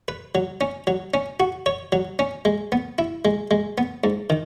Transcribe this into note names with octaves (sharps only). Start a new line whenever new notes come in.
B4
F#3
C#4
F#3
C#4
F#4
C#5
F#3
C#4
G#3
B3
E4
G#3
G#3
B3
G#2
D#3